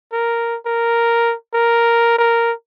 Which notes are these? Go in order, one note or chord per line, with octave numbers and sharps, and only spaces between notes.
A#4
A#4
A#4
A#4